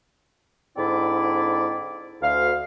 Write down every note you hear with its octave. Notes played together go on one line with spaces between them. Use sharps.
G#2 D3 C4 E4 D5
D2 F5